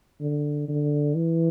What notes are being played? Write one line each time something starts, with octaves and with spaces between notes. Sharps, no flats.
D3
D3
E3